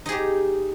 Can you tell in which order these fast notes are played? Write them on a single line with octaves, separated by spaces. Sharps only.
D#4 G#4 G4